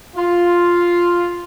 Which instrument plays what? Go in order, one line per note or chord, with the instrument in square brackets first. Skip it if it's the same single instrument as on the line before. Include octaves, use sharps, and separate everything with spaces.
[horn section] F4